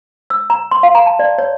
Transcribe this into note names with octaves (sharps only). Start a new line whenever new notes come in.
E6
A#5
C6
F5
A#5
A5
D5
C#5